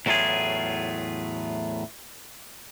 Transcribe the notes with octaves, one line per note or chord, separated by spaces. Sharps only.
E2 A2 F#3 A3 F4 G#4